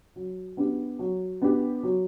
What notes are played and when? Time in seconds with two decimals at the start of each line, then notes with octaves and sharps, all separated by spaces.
0.16 F#3
0.57 B3 D4 G4
0.99 F#3
1.42 B3 D4 G4
1.83 F#3